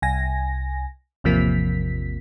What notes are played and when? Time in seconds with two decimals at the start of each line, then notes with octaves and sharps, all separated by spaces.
0.02 C2 G#5 A#6
1.24 A1 E2 C3 F3 A#3 B6